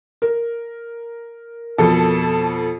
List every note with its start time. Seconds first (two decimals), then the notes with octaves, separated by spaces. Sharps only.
0.22 A#4
1.78 F2 B2 A4 A5